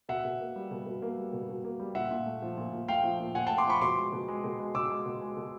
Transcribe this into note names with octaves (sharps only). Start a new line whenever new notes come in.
B2 E5 F#5
B2
A#3
G3
B2
B2
A#3
G3
B2
B2
A#3
G3
A#2 E5 F#5
A#2
A3
F3
A#2
A#2
A3 F5 G5
F3
A#2
A#2 F#5 G#5
A3 G5 A5
C6 D6
F3 B5 C#6
B2 C6 D6
G#3
B2
G#3
B2
G#3
B2 D6 E6
G#3
B2
G#3
B2